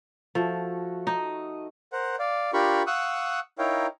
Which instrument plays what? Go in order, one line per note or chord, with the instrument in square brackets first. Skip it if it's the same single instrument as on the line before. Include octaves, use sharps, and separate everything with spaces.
[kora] F3 [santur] A3 F#4
[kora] D#4 [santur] D#5
[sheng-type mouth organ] A#4 C5 F#5
D5 F5
D4 F4 G4 A#4 B5 C#6
F5 F#5 C#6 D#6 E6 F#6
D#4 E4 A#4 C#5 F5 G5